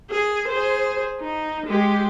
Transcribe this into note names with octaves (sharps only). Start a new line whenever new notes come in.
G#4
G#4 C5
D#4
G#3 G4